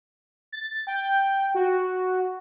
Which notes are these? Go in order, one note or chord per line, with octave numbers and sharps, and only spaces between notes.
A6
G5
F#4